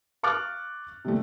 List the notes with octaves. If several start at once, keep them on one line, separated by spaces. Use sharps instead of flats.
F5 C#6 D6 F6 F#6 A6
C3 G3 A3